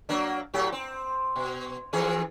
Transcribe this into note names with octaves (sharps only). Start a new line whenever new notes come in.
F#3 A#3 D4
A2 F#3 G4
C4
B2
F2 E3 G#4